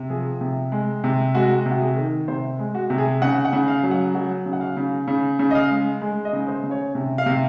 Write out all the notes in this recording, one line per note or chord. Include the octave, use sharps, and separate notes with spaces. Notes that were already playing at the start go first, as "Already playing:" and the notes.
Already playing: C3
F3 G#4
C3
G#3
C3
G#3 F#4
C3
F#4
G#4
D#3
C3 C5
G#3
F#4
C3
G#4
C#3 F#5
F#5
C#3
F5
F#3
F#5
F#3 F#5
C#3
F#5
F5
C#3
C#3
C#3
D#5
F5
G#3
G#3
D#5
C#3
C5
C#3
C#5
C3
F5
C3